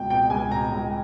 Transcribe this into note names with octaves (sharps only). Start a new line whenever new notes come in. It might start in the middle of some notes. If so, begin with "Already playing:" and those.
Already playing: C#2 B2 G5
B2 G5
C#2 G#5
B2 A#5
C#2